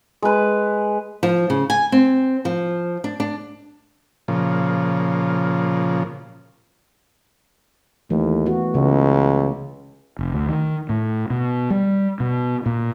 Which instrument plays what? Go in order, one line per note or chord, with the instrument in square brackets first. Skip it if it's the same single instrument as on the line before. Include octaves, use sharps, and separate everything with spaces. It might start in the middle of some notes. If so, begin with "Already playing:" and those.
[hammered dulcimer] G#3 B4
[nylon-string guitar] F3
C#3
G#5
C4
F3
D4
D4
[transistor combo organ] A#2 C#3 F3
[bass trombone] D#2 [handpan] E3 A3
[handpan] B3 F#4
[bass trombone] C#2 [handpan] C#3
[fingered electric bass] F1
D2
D#3
A2
B2
G3
B2
A#2